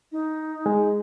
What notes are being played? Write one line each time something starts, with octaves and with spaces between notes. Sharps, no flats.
D#4
G#3